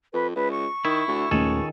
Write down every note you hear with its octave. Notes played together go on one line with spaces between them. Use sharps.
F2 B4
C#2 B4
C#6
D#3 E4
D2
D#1 C#2 D#3 A3 C#4 G#4 A4